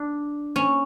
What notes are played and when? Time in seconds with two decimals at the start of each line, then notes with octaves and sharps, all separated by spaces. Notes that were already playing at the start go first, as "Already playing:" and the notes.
Already playing: D4
0.56 C#4